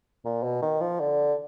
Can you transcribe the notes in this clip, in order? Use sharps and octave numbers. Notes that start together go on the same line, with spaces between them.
A#2
B2
D#3
F3
D3